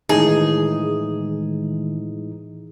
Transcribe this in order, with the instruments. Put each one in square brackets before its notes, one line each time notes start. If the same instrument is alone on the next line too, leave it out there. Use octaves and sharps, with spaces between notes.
[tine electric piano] A2 E3 D#4 [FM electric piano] D#3 G#3 [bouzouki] G#4